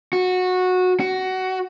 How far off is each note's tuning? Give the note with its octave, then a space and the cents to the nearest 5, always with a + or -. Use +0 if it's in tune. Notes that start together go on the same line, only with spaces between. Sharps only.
F#4 -15
F#4 +15